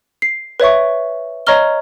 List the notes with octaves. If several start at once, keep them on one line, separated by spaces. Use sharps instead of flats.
C7
B4 C#5 E5 C#6
C#5 D#5 A#5 C#6 F6 G7